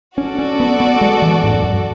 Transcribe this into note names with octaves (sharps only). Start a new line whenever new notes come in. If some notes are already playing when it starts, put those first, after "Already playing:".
C#4 F#4 A4 D5
C#4
B3
B3
G#3
E3
G#2
F#2
F#2